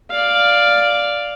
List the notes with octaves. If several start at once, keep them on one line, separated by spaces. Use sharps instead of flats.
D5 F5